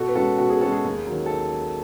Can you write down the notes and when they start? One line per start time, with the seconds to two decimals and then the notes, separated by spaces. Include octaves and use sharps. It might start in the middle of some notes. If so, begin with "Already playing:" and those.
Already playing: B2 F#4 A4
0.09 B4
0.15 G#3 C#4 F#4 A4
0.38 B2 F#4
0.50 G#4
0.61 G#3 C#4 F#4 A4
0.73 G#4
0.84 D#2
1.07 D#3 F#3
1.26 A4